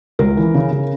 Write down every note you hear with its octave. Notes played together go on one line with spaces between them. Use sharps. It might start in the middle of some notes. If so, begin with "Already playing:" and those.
C#2 A#4
E3
C#3
C#3